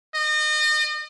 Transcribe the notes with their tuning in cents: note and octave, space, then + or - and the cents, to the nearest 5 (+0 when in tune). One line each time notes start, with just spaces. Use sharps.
D#5 -35